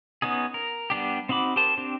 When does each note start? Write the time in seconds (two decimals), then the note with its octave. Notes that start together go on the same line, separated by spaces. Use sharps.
0.22 B3 C#4 D#4 G#4
0.54 A#4
0.90 G3 B3 D4 G4
1.29 C4 D#4 F#4 B5 D6
1.56 G4 A#4 C5 A5
1.78 C4 D4 G4